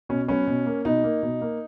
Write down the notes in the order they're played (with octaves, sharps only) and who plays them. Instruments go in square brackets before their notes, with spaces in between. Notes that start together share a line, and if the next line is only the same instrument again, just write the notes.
[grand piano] B2 C#4
F#3 B3 C#4
B2
A#3
B2 D#4
A#3
B2
A#3